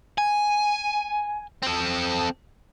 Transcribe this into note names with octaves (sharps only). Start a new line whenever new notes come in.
G#5
C4 A4